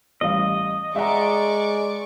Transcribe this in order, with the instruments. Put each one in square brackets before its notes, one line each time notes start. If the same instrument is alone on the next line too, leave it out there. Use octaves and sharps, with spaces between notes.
[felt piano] A1 G3 F5 [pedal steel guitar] D#5
[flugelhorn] G#3 [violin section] D5 C#6 D6 [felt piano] E5 F#5 A#5